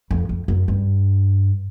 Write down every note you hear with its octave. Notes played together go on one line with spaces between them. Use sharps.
F2
F2
F#2
G2